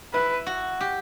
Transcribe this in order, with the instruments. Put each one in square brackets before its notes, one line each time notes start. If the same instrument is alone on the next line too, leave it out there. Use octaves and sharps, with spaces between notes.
[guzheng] E4 [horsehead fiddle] B4
[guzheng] F#4
G4